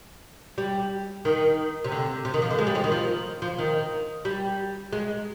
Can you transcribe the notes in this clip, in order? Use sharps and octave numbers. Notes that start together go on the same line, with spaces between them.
G3
D#3
C3
D3
C3
D#3
F3
D3
G#3
G3
F3
D#3
F3
F3
D#3
G3
G#3